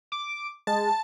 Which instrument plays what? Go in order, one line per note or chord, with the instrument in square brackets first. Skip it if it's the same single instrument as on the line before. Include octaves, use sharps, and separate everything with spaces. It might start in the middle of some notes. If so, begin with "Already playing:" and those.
[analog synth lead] D6
[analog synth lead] G#3 [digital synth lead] A5